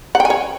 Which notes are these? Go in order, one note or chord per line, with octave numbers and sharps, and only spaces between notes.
F#5
G5
G#5
C#5